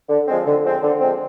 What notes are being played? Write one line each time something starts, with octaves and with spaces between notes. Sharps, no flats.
D3
F3 G#3 C4
D3
F3 G#3 C4
D3
F3 G#3 C4